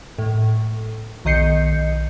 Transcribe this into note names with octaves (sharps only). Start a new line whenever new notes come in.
A2
B1 D#3 D#5 G6 C7 C#7